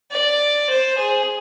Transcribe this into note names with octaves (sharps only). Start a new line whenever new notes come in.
D5
C5
G#4